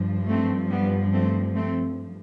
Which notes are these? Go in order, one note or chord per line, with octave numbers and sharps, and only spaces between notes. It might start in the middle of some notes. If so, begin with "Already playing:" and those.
Already playing: G2 F3
A3 C4
G3 B3
A3 C4
A3 C4